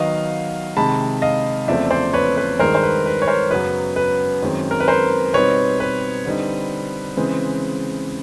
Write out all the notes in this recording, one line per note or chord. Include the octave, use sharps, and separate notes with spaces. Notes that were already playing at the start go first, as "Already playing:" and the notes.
Already playing: D#3 F#3 B3 D#5 F5
C3 D#3 G#3 A5 B5
D#5 F5
E2 C#3 F3 A3 C4 D5 E5
C5 D5
B4 C#5
B4
G2 D#3 G#3 A#4 C5
C5
B4
B4
C#5
A#4 C5
F#2 C#3 F#3 B3 B4
B4
F#2 D#3 G#3 C4
A#4
B4
A#4 C5
B2 G3 C4 D#4 B4 C#5
B4
D3 G3 C4 D#4
C#3 E3 G#3 C4